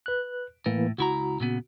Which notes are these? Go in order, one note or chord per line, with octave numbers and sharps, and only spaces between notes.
B4 F#6
A2 E3 A#3
C#2 E4 F#4 A#5
A#2 C#3 B3